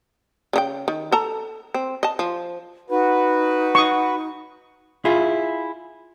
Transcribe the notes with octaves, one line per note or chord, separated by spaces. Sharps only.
C#3 D#4 G5
D#3
A4 A5 A#5
C4
D#5 A5
F3
D#4 F#4 B4
C#6 D#6
E4 F4 G#4